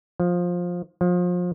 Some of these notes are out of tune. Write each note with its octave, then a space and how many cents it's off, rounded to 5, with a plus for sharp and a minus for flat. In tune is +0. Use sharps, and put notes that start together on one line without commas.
F3 +15
F3 +30